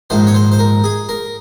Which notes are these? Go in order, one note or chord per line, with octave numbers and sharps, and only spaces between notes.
A#1 G#2 D#3 C5
C#5
C5
C5
A#4
G#4
A#4